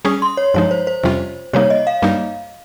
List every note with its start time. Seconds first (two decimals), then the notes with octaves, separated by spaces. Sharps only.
0.05 G3 C#4 G#4 D#6
0.22 C6
0.37 C#5
0.54 G2 F3 G#3 D#4 C#5
0.71 C5
0.87 C5
1.04 F2 C3 G3 C#4 F4
1.53 C3 G3 A#3 D#4 C#5
1.70 D#5
1.87 F5
2.02 G2 G3 A#3 D#4